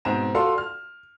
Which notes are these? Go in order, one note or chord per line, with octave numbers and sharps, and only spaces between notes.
G#2 B2 C4 A#5 E7
F4 F#4 A4 D5 F5 C6
F6